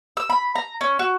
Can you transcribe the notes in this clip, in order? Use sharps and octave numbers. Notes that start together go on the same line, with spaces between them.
E6
B5
A#5
C#4
F#4